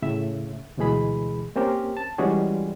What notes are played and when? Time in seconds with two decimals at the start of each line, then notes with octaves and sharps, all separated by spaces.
0.02 A2 C#3 E5
0.77 D2 B2 E3 G#3 G#4 B5
1.56 A#3 C4 C#4 G4 A#4
1.97 A5
2.18 E3 G3 G#3 C#4 F#4 G#4